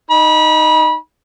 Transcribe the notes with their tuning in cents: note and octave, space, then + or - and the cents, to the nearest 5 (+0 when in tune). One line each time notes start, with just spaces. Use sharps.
D#4 -5 B5 -30